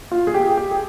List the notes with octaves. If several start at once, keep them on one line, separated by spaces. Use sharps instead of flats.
F4
G#4
G4
G4
G#4